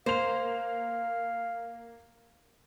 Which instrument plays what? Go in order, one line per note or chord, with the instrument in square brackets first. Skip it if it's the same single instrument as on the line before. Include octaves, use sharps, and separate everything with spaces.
[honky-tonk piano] A#3 F7 [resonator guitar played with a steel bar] C5 [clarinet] F5